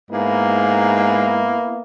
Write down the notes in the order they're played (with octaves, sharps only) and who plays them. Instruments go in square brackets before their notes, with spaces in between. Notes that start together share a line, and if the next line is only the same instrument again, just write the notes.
[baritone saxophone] G#2 [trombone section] A#3 B3 E4